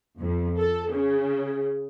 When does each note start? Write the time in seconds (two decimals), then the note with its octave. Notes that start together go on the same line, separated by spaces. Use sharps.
0.19 F2
0.59 A4
0.92 C#3